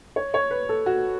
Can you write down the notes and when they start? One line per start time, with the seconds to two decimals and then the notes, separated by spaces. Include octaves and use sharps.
0.16 C#5
0.34 C#5
0.51 B4
0.69 A4
0.86 F#4